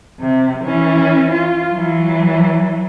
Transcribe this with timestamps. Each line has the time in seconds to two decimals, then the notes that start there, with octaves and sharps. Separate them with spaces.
0.20 C3
0.65 E3 C#4
1.31 F4
1.72 E3 F#3